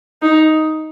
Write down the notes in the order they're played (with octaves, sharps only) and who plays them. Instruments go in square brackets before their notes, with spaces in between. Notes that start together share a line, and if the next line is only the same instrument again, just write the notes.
[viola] D#4